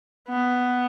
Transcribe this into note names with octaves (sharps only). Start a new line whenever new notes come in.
B3